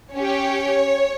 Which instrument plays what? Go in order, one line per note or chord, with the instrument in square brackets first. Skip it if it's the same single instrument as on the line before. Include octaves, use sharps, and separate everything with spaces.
[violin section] C#4 G4 C#5